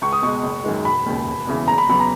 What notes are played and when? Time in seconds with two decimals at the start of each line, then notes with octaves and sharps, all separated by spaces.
0.01 C#2 C#6
0.13 D#6
0.22 B2 G#3 C#6
0.43 F#1
0.64 F#2 D#3 G#3
0.85 E1 B5
1.06 D#2 C#3
1.26 E1
1.47 E2 C#3 E3
1.68 F#1 A#5
1.78 B5
1.89 E2 C#3 F#3 B3 B5
2.00 A#5